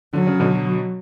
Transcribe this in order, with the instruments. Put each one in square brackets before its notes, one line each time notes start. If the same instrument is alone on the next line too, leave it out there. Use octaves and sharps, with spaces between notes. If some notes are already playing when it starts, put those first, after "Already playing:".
[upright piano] D3 [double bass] F#3
[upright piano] C#3
B2 D3